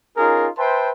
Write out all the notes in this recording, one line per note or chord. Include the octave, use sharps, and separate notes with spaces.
C#4 D#4 F4 G#4 A#4
B4 C5 E5 G5 A5 C6